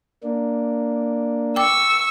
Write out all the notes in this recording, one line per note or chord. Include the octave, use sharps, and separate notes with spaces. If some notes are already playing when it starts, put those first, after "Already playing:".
A#3 D4
G5 C#6 D6 E6